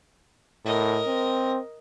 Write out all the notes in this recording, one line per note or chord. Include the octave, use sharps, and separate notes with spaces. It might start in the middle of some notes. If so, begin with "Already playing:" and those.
A2 A#4 D#5
C4